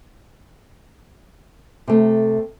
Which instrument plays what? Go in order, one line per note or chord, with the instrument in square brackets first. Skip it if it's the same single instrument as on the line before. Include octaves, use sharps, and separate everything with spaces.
[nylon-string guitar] C3 A3